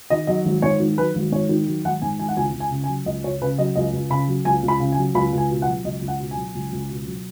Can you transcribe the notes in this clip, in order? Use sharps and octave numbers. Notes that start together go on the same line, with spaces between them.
D#3 D#5
F#3 D#5
G#1
G#2 C#5
D#3
F#3 B4
G#1
G#2 C#5
D#3
F#3
G#1 F#5
G#2 G#5
D#3 G#5
F#5
C#2 G#5
C#2
G#5
C#3
G#5
F#3
C#2 D#5
C#2 C#5
C#3 B4
F#3 D#5
C#2 D#5
C#2
C#3 B5
F#3
C#2 G#5
C#2
B5
C#3
G#5
F#3
C#2 B5
C#2
G#5
B2
F#5
F#3
C#2 D#5
C#2
F#5
B2
G#5
F#3
C#2
C#2
B2
F#3